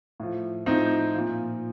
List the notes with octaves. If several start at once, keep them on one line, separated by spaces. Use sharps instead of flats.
A2 F3
A2 F3 C4 D#4
A#2 F3